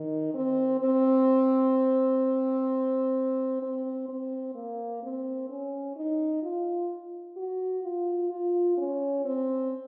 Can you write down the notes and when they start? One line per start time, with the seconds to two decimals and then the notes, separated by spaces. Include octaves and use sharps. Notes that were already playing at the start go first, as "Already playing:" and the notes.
Already playing: D#3
0.34 C4
0.80 C4
3.62 C4
4.09 C4
4.55 A#3
5.03 C4
5.50 C#4
5.96 D#4
6.43 F4
7.37 F#4
7.83 F4
8.31 F4
8.78 C#4
9.25 C4